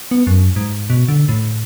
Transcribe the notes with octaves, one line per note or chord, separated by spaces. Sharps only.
B3
F#2
G#2
B2
D3
A2